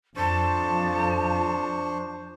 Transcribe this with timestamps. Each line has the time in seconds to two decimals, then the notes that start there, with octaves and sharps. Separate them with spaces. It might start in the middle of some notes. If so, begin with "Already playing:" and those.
0.16 F2 F3 D4 C5 A5 C#6